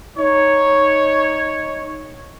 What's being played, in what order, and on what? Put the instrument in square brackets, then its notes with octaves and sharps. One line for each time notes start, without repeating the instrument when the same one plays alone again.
[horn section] D#4 C#5